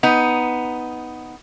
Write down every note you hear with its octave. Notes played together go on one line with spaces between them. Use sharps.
B3 D#4